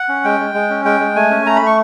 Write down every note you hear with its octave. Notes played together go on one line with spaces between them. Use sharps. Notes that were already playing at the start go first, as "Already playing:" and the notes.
Already playing: F#5
C#4
G#3 G5
G#3
G#3
C#4
G#3 G5
G#3
A3 G#5
C#4
A3 A#5
B5
A3
C#6